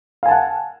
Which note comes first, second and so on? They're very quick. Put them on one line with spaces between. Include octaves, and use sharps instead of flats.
F5 G#5 A5 F#5